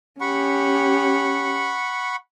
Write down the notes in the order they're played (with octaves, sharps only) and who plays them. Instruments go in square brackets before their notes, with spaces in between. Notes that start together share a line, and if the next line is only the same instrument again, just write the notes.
[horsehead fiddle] C#4 G4 [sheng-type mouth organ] F#5 B5 C#6